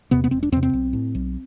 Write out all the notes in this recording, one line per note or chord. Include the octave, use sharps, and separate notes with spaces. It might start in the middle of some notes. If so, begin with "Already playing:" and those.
E2 C3 B3
B3
E1 C4
D4
E2 C3 C4
C4
B1
A2
B1